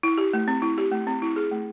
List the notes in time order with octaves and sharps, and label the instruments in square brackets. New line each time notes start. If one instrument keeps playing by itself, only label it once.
[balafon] E4
G4
A3
C4
E4
G4
A3
C4
E4
G#4
A3